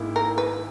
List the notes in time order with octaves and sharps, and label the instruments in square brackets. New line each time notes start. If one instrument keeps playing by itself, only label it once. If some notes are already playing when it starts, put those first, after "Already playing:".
Already playing: [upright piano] G#1 G#2 D#3 A#3 E4
[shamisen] A#4
B4